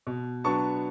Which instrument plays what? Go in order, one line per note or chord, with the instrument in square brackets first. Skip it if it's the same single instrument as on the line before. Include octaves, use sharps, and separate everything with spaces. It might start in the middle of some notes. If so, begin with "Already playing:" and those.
[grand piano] B2
F#3 B3 D4 A5 C#6